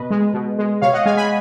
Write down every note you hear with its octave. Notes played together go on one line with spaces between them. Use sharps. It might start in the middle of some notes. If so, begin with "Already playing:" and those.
Already playing: B2 B4 D#5
G#3
B2
G#3
B2 C#5 F5
D#5 F#5
G#3 F5 G#5
G#5 B5